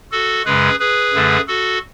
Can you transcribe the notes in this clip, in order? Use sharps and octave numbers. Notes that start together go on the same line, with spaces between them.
F#4 A4
F#2 C#3 G#3 G#4 B4
G#4 B4
F#2 D3 A3
F#4 A4